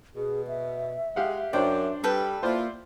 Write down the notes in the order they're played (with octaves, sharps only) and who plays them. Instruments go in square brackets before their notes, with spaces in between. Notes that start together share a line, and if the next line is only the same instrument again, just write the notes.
[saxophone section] B2 [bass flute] G#4
[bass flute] E5
[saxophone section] G#3 [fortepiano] G4 F5 F#5
[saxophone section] F#2 [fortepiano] D4 C5 D5 [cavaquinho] G5
[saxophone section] G3 [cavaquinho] A4 B4 G5
[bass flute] A#3 [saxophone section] E4 F4 [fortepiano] C5 D5